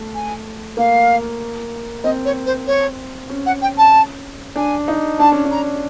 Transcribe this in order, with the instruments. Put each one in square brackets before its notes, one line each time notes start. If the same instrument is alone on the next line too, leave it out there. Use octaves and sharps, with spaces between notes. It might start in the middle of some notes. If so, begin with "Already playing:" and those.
Already playing: [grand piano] A3
[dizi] G#5
[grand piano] A#3 [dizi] F5
[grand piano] C4 [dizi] D#5
[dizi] C#5
C5
C#5
[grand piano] C#4
[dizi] F#5
G5
A5
[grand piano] D4 [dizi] G#5
[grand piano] D#4
[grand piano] D4 [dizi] A5
[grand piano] C#4
D4
[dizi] A#5